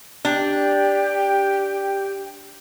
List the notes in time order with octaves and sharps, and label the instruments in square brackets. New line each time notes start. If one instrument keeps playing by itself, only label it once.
[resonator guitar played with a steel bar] D4 [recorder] G4